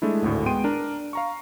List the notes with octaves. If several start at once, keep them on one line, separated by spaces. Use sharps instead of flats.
G#3 A3 D4 E4
G#1 D2 A2
G#3 B3 G5 C6 D7 D#7
D4 A#4
F5 A#5 C#6